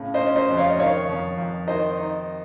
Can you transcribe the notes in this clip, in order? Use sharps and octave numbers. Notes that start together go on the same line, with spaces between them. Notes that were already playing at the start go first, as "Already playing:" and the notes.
Already playing: A2 C#3
C5 D#5
C#4
C5 D#5
F2
C#5 F5
D#5
D#3 C#5 F5
F2
F2
D#3 C5 D#5
D#4